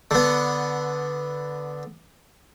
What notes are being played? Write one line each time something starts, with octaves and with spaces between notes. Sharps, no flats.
D3 B3